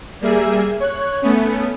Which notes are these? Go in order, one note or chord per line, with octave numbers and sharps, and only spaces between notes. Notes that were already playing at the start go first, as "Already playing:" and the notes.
G3 A#3 G#4 E5
C#5 F#6
A3 B3 C#4